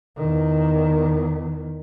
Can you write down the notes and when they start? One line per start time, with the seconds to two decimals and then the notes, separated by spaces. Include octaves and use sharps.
0.16 E2 D#3